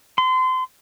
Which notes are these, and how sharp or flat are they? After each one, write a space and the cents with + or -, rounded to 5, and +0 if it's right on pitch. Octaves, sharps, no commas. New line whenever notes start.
C6 -30